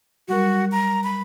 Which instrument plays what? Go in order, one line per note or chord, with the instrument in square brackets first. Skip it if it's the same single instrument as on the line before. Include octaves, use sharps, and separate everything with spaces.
[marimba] F#3 G3 A#4 [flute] F#4
[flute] A#5
B5